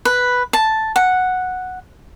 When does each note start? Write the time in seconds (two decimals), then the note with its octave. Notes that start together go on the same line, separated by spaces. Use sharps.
0.05 B4
0.53 A5
0.96 F#5